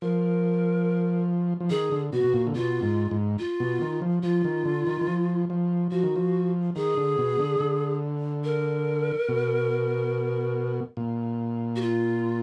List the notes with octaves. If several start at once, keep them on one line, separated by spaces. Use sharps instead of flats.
F3 A#4
F3
D#3 G#4
D3
B2 F#4
B2
A#2
D3
B2 F4
G#2
G#2
F4
B2
D#3
F3
F3 F4
D#3
D3
D#3
D#3
F3
F3
F3 F#4
D#3
F3
D#3 G#4
D3
B2
D3
D3
A#4
B2
A#2
F#4
F4